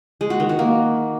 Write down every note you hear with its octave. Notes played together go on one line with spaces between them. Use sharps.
G#3
F#4
D#3
F#4
A#3